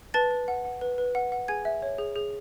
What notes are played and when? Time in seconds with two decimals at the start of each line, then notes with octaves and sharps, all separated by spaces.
0.14 B4 A5 A6
0.31 B4
0.48 F#5
0.65 F#5
0.81 B4
0.98 B4
1.15 F#5
1.32 F#5
1.48 G#4 G#5 G#6
1.65 E5
1.82 C#5
1.98 G#4
2.16 G#4